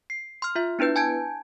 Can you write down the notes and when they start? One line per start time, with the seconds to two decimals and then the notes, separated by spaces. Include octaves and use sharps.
0.10 C7
0.42 C6 F6
0.55 F4 E5
0.79 B3 D4 E4 B4 G6
0.96 G#5 A5 G6 G#6 D7